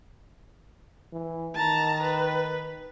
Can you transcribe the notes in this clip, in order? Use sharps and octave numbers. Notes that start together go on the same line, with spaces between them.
E3
D#3 A5 A#5
B4